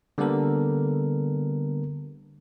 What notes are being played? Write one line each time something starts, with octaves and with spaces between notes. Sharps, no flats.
D3 G3 A#3 B3 A4 A#4